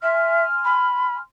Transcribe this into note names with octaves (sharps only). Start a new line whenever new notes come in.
E5 G#5 C6 F6
B5